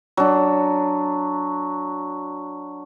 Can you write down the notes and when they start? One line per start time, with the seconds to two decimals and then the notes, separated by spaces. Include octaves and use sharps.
0.17 F#3 D4